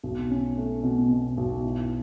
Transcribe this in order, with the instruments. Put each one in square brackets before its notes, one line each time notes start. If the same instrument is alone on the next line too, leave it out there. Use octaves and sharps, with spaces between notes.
[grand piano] B1
C#4
A3
B2
B2
B1
E4